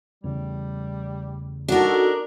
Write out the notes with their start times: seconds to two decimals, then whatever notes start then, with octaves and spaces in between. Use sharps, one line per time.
0.24 E2 C#3 G3 A3
1.68 D4 D#4 F#4 A4 A#4